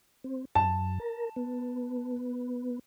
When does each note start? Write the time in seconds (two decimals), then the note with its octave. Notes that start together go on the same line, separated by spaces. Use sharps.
0.24 C4
0.55 F#2 A5
1.00 A#4
1.36 B3